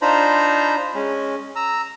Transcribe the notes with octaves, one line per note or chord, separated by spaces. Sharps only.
D4 D#4 F4 C5 A#5 B5
G#3 C#4
A#5 E6